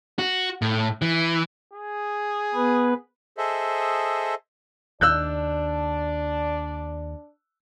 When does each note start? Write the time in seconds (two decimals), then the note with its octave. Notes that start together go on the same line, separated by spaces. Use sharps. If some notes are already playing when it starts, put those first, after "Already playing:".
0.19 F#4
0.62 A2
1.02 E3
1.74 G#4
2.55 B3 B4
3.38 G#4 A4 C5 D#5 E5
5.01 D#2 D4 D5 E6 F#6 G6